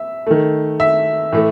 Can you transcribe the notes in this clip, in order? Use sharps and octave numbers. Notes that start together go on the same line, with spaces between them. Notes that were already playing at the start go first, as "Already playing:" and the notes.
Already playing: E5
D#3 A3
E5
A2 E3 A3